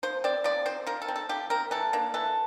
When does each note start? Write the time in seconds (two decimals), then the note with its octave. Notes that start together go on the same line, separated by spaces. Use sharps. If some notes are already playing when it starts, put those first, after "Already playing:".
0.03 F3 C5
0.24 C4 D5
0.44 F3 D5
0.66 C4 C5
0.87 F3 A#4
1.02 A4
1.08 C4
1.16 A4
1.29 F3 G4
1.50 C4 A#4
1.71 E3 A4
1.93 A#3 D4
2.14 E3 A4